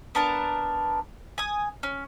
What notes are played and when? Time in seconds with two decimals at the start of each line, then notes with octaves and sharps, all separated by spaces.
0.15 B3 D4 A#4 A5
1.38 G#5 D#6
1.83 C#4